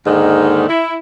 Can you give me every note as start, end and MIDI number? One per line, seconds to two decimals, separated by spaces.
0.06 0.67 39
0.06 0.67 44
0.06 0.67 50
0.06 0.67 51
0.69 0.96 64